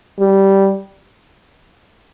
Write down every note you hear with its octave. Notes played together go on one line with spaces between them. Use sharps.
G3